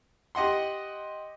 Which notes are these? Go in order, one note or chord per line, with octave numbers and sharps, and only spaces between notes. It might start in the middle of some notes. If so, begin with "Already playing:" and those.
G4 D#5 F#5 C6